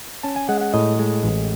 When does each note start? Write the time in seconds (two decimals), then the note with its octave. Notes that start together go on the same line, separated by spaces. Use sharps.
0.23 C#4 A5
0.36 G#5
0.49 G#3 F#5
0.61 F#5
0.74 A2 D#5
0.99 G#3
1.23 A1